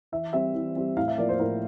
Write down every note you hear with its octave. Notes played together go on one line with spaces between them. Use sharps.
E3 E5
G3 C4 E5
E3
G3 C4
A2 F5
E5
F3 A#3 D5
C5
A2 A#4